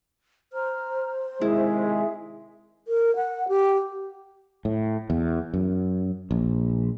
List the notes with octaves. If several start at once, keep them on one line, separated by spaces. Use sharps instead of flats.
C5 A#5 F6
C3 D#3 G#3 E4 G#4 E5
A#4
F#5
G4
A2
E2
F#2
A#1